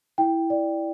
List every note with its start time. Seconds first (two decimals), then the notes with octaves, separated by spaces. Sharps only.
0.18 E4 G5
0.50 D5